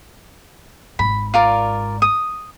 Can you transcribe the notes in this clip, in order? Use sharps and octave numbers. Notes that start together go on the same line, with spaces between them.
G#1 G#2 B5
F4 A#4 D5
D#6